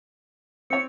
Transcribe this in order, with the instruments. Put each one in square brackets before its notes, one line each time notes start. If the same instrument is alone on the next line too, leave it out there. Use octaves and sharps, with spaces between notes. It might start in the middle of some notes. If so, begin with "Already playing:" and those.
[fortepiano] C4 C#5 [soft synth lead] C#7